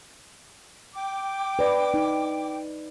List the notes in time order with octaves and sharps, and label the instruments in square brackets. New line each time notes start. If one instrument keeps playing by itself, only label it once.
[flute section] G5 D6
[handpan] B4 D5
D#4